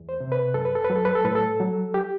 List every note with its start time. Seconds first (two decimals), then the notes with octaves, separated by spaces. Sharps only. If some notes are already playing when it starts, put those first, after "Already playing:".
Already playing: E2
0.09 C5
0.20 C3
0.32 B4
0.54 F#2 A4
0.65 B4
0.75 A4
0.85 B4
0.90 F#3
0.96 A4
1.05 B4
1.15 A4
1.24 A2 B4
1.35 A4
1.60 F#3
1.94 G4